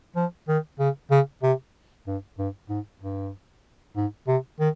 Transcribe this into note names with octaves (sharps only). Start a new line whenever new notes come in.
F3
D#3
C#3
C#3
C3
G2
G2
G#2
G2
G#2
C3
D#3